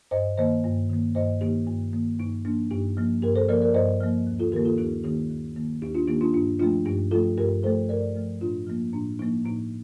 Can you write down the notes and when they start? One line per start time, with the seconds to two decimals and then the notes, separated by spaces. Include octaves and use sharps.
0.11 G2 C5 D#5
0.38 D#3 A#3 C5 D#5
0.64 G2
0.90 D#3 A#3
1.15 G2 C5 D#5
1.41 D#3 A#3 D#4 G4
1.67 G2
1.93 D#3 A#3
2.19 G2 D#4
2.45 F3 A#3 D4
2.71 G2 D#4 G4
2.97 F3 A#3
3.22 G2 G4 A#4
3.36 A4 C5
3.49 F3 A#3 A#4 D5
3.62 A#4 D5
3.74 G2 C5 D#5
4.01 F3 A#3
4.27 D#2
4.39 F4 A4
4.52 D#3 A#3 G4 A#4
4.65 F4 A4
4.78 D#2 D#4 G4
5.04 D#3 A#3 D#4 G4
5.30 D#2
5.56 D#3 A#3
5.82 D#2 D#4 G4
5.95 D4 F4
6.08 D#3 A#3 D#4 G4
6.21 D4 F4
6.33 G2 D4 F4
6.59 F3 A3 D4 F4
6.85 G2 D#4 G4
7.11 F3 A3 F4 A4
7.37 G2 G4 A#4
7.63 F3 A3 A4 C5
7.89 G2 A#4 D5
8.16 F3 A3
8.41 A2 D4 F4
8.67 F3 A#3
8.93 A2 D4
9.19 F3 A#3 D#4
9.45 A2 D#4